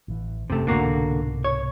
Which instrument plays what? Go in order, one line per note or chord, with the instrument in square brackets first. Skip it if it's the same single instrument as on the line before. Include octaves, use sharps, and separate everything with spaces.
[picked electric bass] A1 E3
[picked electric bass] F#1 F2 C#4 [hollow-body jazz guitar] C3 A3
[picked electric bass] C2 G#2 B2 [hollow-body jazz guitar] D3 A#3 F#4
[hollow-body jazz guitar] C#5